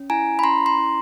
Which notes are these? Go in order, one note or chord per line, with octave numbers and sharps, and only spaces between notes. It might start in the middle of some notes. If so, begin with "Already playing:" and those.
Already playing: C#4
E4 G#5 A#5
B5
C#4 A#5 C6
A#5 C6
E4